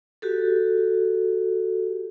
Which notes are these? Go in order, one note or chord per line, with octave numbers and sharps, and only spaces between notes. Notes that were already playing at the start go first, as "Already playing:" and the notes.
F#4 G4 A4